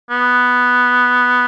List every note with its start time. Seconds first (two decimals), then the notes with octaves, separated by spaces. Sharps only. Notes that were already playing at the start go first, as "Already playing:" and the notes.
0.11 B3